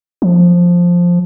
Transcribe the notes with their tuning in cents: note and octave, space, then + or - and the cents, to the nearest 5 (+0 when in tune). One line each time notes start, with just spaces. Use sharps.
F3 +5